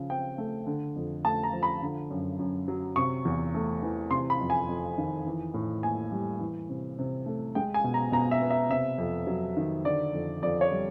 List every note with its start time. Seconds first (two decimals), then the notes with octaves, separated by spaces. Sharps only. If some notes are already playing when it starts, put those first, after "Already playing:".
Already playing: C#3 F3
0.10 C4 G5
0.38 A3
0.66 D3
0.96 F2
1.25 A3 A5
1.43 A#5
1.53 F3
1.63 B5
1.82 D3
2.10 F#2
2.39 F#2
2.68 F#3
2.96 C3 C#6
3.25 E2
3.54 A3
3.82 E3
4.11 C3 C6
4.30 B5
4.40 F2
4.50 G#5
4.69 F2
4.98 D#3
5.26 E3
5.54 A2
5.83 A#3 G#5
6.12 G3
6.40 E3
6.69 C3
6.99 C3
7.26 A3
7.55 G#3 G5
7.74 G#5
7.84 B2
7.94 A#5
8.12 B2 A#5
8.31 E5
8.41 B3
8.50 E5
8.70 C3 E5
8.98 F2
9.27 F#3
9.57 D#3
9.85 D3 D5
10.13 F2
10.42 F2 D5
10.61 C#5
10.71 G3